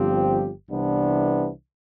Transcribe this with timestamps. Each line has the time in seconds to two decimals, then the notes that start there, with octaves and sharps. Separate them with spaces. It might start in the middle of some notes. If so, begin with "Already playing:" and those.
Already playing: G1 G2 F3 C4 G4
0.70 C2 C3 E3 B3 D4